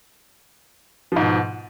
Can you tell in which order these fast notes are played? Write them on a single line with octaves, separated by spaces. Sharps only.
F3 G#2 B2